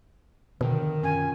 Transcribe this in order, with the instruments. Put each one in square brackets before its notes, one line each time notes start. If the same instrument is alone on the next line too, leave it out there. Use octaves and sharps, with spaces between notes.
[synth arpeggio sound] B2 [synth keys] D3 F3 [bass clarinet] D#3
[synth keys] F#2 C#4 F4 [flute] G#5